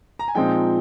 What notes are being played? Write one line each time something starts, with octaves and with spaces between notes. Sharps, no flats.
A#5
G#5
A#2 F3 G#3 C4 D#4 G5